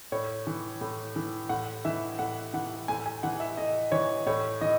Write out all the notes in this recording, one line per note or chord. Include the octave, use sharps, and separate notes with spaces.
A2 C#5
E3
A2
E3
A2 F#5
E3 E5
A2 F#5
E3 F#5
A2 G#5
G#5
E3 F#5
E5
A2 D#5
E3 C#5
A2 C#5
E3 D#5